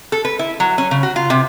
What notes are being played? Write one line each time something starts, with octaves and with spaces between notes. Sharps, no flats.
A4
B4
E4
F#3
C#4
C#3
F#4
F4
C3